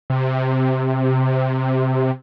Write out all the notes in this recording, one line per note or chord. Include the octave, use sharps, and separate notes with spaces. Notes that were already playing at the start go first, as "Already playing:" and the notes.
C3